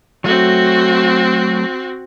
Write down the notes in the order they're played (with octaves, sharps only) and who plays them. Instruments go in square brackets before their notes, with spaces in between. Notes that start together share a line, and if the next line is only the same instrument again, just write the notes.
[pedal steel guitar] F#3 A3 [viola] C4 F#4